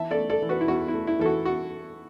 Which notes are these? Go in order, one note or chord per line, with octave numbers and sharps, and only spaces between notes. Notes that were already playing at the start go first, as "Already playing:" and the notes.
Already playing: E3 E5 A5
A4 D5
A3
A4 D5
E3
F#4 B4
E4
E2 F#4
E4
A3
E4
E3 A4
F#4
F#4